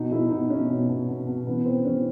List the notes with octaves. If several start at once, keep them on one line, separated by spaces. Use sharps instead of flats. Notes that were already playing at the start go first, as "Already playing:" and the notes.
Already playing: B2 D#4
B2 E4
B2 D#4
B2 C#4
B2
B2
B2
B2
A1 B3
E3 C4
A1 C#4